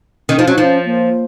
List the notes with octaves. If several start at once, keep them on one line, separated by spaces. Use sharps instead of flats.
D#3 C#4
F3 D#4
F#3 C#4
F3 D#4
C#4
A#3